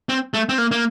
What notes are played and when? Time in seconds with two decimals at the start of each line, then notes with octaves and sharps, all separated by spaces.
0.09 C4
0.34 A3
0.49 C4
0.58 A#3
0.71 A#3